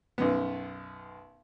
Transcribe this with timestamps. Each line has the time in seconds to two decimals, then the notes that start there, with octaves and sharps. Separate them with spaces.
0.18 B1 F#2 B3